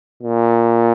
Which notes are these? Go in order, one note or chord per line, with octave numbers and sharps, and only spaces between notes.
A#2